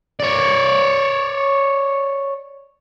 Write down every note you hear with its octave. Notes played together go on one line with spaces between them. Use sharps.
C#5 D5